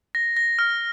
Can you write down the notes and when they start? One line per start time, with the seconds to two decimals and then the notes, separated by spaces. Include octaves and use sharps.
0.15 A#6
0.37 A#6
0.59 F6